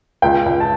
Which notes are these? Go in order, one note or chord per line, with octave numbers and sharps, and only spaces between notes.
C#2 G5
C#2
A5